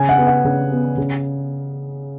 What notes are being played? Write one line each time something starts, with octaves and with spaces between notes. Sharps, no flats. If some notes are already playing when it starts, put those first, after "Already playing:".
Already playing: C#3 G#5
F#5
B3
F#5
C#3
B3
C#3